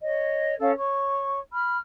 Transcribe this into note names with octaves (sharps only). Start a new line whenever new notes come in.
C#5 D#5
C#4 A4 F5
C#5 C#6
B5 F6